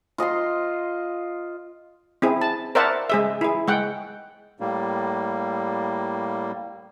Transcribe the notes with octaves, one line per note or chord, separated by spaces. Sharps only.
F4 D#5 A#5 C6
C4 E4 G#4
A5
A#4 C5 D5 E5 F#5 A5
G#3 G#4 E5
E4 G#4
G#3 F#5 G5
A2 G3 A#3